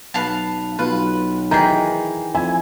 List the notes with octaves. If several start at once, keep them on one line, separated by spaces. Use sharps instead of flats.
B1 B4 F5 A5
B1 F4 B4
D#3 E3 G#4 G5 A#5
F2 E4 G#5